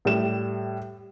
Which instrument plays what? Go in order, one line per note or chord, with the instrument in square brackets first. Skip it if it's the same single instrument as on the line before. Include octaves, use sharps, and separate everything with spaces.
[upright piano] A2 G3 E7